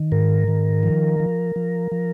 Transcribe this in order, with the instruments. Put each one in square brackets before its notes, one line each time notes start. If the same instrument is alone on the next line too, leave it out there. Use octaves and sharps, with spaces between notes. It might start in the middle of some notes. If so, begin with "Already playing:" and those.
Already playing: [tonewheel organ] D#3
G#2 A#4
D#3
F3
F3
F3
F3